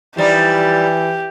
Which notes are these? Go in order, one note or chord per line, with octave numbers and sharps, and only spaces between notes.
E3 F3 G3 D#4 G4